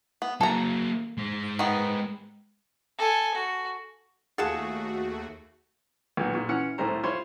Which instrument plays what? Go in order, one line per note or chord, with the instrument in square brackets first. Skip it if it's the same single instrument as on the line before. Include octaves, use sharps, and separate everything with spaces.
[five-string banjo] B3
[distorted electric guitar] F#3 A#3 [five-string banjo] A4 A#5
[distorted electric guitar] G#3 C5
[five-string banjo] D#3 B3
[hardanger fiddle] A4 G#5
F#4
[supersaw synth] D#2 A3 F#4 [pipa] F4 F#5 A5 [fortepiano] G#4
[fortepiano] B1 A#2
A#2
E3 C#4 F#5 F6
C2 A2 A3 A#4 C5 A#5
F4 C5 C#5 B5 C6